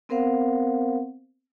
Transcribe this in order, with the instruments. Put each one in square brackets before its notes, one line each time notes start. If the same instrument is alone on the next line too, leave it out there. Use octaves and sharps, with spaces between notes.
[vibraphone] B3 C4 A#4 C5 F5 F#5